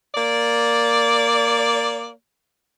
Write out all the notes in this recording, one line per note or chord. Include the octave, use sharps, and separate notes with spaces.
A#3 D5